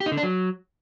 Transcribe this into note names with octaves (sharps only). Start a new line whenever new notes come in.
G4
D#4
D3
D4
F#3